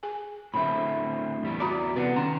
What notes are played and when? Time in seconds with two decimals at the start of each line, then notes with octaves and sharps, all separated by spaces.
0.03 G#4 G#5
0.54 A2 D3 C4 E5 B5
1.43 E2 G3 E4
1.60 F#4 D5 A#5 B5
1.96 C3 B3 B4 D5 F5 F#5
2.16 D#3 C#4 G5 A#5 C6